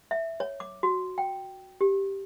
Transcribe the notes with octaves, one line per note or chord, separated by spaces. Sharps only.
E5
C#5
D6
F#4
G5
G4